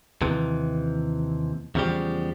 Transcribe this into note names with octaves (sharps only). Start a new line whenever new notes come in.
D#2 C3 E3
E2 C#3 F3 G3 G4